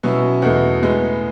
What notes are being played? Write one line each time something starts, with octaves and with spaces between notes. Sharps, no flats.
B2 F#3 C#4 E4
E2 B2 A3 D#4
A2 G#3 B3 D#4